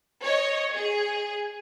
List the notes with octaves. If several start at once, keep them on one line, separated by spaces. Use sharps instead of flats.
C#5 D#5
G#4